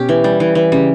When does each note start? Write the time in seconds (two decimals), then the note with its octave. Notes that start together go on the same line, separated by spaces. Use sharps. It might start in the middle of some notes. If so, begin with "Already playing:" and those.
Already playing: B2 C#4 G4
0.09 E3
0.24 G3
0.40 E3
0.55 E3
0.72 C#3 G3